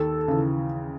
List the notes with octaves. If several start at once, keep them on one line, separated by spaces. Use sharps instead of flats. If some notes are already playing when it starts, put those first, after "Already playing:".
Already playing: D#2 A4
C#3 E3